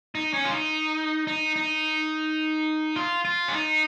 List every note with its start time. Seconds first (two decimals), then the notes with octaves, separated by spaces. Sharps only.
0.15 D#4
0.34 C#4
0.45 F4
0.52 D#4
1.27 D#4
1.56 D#4
2.96 F4
3.25 F4
3.48 C#4
3.53 D#4